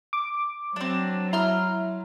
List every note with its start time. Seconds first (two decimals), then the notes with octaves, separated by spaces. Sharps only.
0.13 D6
0.76 F#3 C4 D4
1.33 E4 A#5 C6 F6